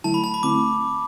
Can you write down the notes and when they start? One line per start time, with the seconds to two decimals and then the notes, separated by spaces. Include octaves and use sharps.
0.04 D3 F#3 A3 E4 A5
0.14 B5
0.24 A5
0.34 B5
0.43 D3 A3 C4 E4 D6